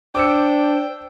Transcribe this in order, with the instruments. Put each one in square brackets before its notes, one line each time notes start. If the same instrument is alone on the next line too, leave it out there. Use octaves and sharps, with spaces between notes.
[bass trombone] D4 [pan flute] C5 [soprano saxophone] G5 [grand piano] D6 E6 C#7